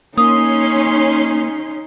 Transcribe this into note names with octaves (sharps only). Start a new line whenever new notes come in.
A#3 C#4 D#4 C6 D#6